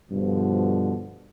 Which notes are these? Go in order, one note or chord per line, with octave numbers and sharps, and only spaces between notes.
G2 B2 D3 F3